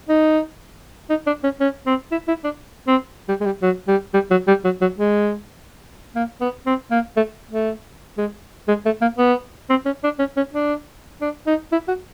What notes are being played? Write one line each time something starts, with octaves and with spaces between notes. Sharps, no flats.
D#4
D#4
D4
C#4
C#4
C4
E4
E4
D4
C4
G3
G#3
G3
F#3
G3
G3
F#3
G3
F#3
F#3
G#3
A#3
B3
C4
A#3
A3
A3
G#3
G#3
A3
A#3
B3
C4
C#4
D4
C#4
C#4
D4
D4
D#4
E4
F#4